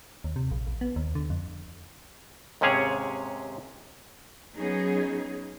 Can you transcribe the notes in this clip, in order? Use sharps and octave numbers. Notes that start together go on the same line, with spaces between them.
D#2
C3
A#1
A#1
B3
D#2
D3
F2
D#2 G#2 C3 C#4 G#4 C#5
F#3 B3 C#4 D#4 G#4